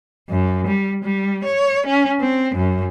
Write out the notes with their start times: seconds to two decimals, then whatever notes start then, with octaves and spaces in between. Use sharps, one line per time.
0.30 F#2
0.67 G3
1.04 G3
1.44 C#5
1.86 C#4
2.21 C4
2.55 F#2